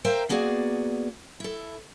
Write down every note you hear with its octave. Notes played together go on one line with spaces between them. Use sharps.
A#4 C5 E5 F5 G5 A#5
A#3 B3 F#4 G#4 D5
E4 A4